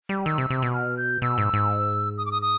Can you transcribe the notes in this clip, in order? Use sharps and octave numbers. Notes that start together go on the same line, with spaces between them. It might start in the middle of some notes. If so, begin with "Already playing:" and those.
G3
D#3 E6
C3
C3
B2
F6
G6
B2 E6
G#2
G#2
D#6
D6
D#6
D#6